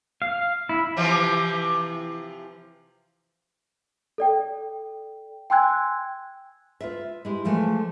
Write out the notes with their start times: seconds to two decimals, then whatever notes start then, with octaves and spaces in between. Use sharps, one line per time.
0.22 F5
0.69 E4
0.97 C3 E3 F3
4.18 A4 D5 G5
5.50 G5 G#5 C6 E6 F#6 G#6
6.81 F4 B4 E5
7.25 G#3 E4 G4
7.45 E3 F3 G#3 A3 D4